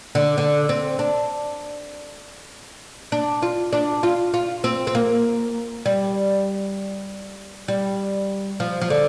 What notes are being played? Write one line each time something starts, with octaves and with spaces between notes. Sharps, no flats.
D3
D3
C4
D4
D4
F4
D4
F4
F4
C4
C4
A#3
G3
G3
F3
F3
D3